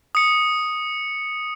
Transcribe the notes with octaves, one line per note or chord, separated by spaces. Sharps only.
D#6 C#7